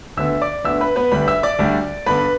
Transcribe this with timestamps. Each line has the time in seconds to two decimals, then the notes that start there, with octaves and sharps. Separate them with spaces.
0.17 D2 D3 B3 E5 E6
0.42 D5 D6
0.64 D2 D3 B3 E5 E6
0.80 B4 B5
0.96 B3 B4
1.12 D2 D3 G3 B4 B5
1.28 E5 E6
1.43 D5 D6
1.59 D2 D3 G3
2.06 G2 D3 B3 B4 B5